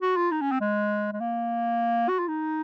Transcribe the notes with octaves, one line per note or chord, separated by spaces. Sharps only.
F#4
F4
D#4
C#4
C4
G#3
G#3
A#3
F#4
F4
D#4